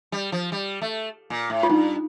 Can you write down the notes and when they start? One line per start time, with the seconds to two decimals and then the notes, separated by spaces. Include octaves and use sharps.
0.12 G3
0.32 F3
0.52 G3
0.81 A3
1.30 A#2
1.50 A2
1.63 F4
1.69 G2 D#4